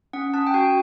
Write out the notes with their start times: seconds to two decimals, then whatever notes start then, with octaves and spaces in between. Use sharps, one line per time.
0.13 C#4 F#5
0.34 C#4 A5
0.47 G5
0.54 F#4 G#5